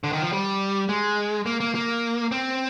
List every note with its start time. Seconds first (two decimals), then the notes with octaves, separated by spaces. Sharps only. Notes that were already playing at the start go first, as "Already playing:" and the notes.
0.04 D3
0.13 D#3
0.22 F3
0.33 G3
0.89 G#3
1.46 A#3
1.60 A#3
1.75 A#3
2.32 C4